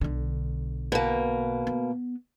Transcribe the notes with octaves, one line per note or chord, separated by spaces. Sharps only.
B1 D3
B2 A#3
B3